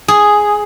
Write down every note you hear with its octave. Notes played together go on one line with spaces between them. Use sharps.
G#4